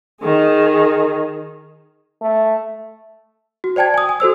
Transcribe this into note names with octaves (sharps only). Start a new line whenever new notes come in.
D#3 G#4
A3
F#4
C5 D5 G5 A5 G#6
G#5 D#6
G#5
F#4 A4 C5 E6